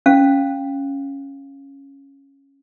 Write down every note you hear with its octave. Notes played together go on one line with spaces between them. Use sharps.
C#4 F5